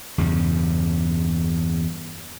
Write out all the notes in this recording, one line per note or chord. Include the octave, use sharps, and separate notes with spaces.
E2 G2 C#3